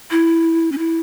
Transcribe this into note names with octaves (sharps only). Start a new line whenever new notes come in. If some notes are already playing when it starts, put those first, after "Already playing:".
E4
C#4
E4